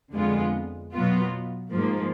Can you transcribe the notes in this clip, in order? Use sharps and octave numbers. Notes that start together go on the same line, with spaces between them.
F2 D3 G#3 B3 F4
B2 F#3 B3 F4
G#2 F3 A#3